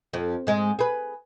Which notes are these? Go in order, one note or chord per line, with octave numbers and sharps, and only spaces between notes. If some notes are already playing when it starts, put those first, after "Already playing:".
F2
G#2 G#3
G#4 B4